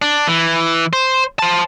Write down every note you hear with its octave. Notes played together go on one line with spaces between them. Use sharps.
D4
E3
C5
C5 A5